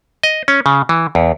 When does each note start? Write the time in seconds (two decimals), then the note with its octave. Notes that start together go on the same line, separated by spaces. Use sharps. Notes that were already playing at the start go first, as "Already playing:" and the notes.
0.23 D#5
0.48 C#4
0.66 C#3
0.89 E3
1.15 E2